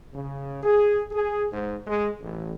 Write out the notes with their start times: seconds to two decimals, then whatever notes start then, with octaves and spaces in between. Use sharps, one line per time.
0.13 C#3
0.63 G#4
1.12 G#4
1.52 G#2
1.87 G#3
2.21 A1